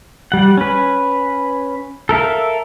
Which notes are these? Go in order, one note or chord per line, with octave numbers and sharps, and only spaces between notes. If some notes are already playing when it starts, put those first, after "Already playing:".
G3 F#5
C#4 B4
A4 A#4 E5 F5